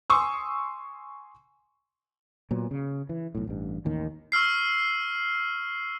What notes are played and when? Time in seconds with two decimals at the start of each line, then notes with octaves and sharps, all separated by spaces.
0.10 G#5 C6 C#6 D#6 E6
2.51 A#2 F#3 B3
2.71 C#3
3.09 E3
3.35 B1 A2
3.47 A1 G2
3.85 A1 D#2 D#3
4.32 C#6 E6 F6 C7